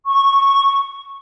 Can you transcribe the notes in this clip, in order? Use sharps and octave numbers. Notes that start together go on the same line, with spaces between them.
C#6